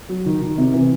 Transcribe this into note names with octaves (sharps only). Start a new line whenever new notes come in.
F#3
D#3
D#3
C3
E3